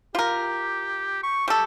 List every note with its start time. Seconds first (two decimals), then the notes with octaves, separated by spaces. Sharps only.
0.15 F4 G4 A#4
1.23 C#6
1.48 G3 G4 A4